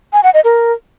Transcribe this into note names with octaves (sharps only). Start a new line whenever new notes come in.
G#5
F#5
D#5
A#4